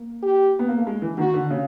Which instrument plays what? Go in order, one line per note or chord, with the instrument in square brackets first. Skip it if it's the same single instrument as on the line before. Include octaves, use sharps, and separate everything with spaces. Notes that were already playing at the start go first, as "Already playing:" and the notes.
Already playing: [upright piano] A#3
[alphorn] G4
[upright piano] B3
A#3
A3
G#3
E3
[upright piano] D#3 [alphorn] F#4
[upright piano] D3
C#3